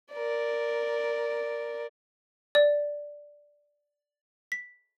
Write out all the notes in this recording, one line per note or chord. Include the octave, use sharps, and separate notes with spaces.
A#4 D5
D5
B6